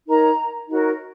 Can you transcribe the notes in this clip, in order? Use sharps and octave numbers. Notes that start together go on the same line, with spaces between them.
D#4 A#4 C#5 A#5
D#4 F#4 A#4 C#5